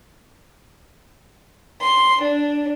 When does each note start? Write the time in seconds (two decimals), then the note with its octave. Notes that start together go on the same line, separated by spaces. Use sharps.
1.82 C6
2.22 D4